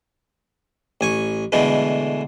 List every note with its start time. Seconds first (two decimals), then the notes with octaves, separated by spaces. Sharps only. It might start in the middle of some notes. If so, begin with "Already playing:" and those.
1.01 A1 G#5 C#6
1.52 B2 D3 E3 G#3 A3